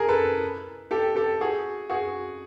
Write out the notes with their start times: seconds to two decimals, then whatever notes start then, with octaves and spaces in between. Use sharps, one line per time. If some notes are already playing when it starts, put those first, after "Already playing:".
Already playing: G#4 A#4
0.08 A4 B4
0.91 G4 A4
1.16 G4 A4
1.41 F#4 G#4
1.90 F#4 G#4